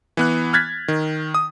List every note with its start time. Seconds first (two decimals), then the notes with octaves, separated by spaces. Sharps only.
0.17 E3 B3 F#6
0.53 F6 F#6 G#6 A6 B6
0.88 D#3
1.34 D#6